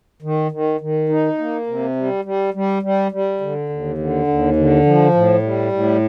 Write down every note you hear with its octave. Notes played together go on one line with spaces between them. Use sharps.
D#3
D#3
D#3
D#4
A#3
C3
G3
G3
G3
G3
G3
D3
D#2
D3
D#2
D3
F3
A2
G3
A2